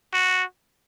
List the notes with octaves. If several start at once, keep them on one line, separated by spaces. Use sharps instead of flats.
F#4